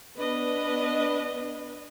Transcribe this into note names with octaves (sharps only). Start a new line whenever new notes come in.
B3 D4 B4 D#5